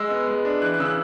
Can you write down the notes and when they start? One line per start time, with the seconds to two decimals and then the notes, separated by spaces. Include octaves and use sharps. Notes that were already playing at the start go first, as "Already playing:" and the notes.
Already playing: G#3 E6
0.10 B3
0.27 G#3
0.45 D4
0.62 E3 F#6
0.74 F#6
0.79 C#3 E6
0.85 F#6